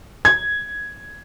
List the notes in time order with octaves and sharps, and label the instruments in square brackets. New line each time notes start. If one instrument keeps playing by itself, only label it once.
[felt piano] G#6